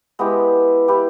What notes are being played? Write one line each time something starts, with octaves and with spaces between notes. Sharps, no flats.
G#3 B3 E4 G4
E4 G4 B4